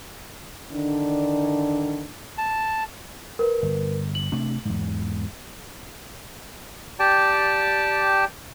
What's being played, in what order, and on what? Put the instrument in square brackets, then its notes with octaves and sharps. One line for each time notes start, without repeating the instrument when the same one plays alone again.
[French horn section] D3 D#3 D4
[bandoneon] A5
[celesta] A#4 B4
[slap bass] G1
[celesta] F#7
[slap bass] C3 A3 D4
E2 G#2
[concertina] G4 D5 G5 A5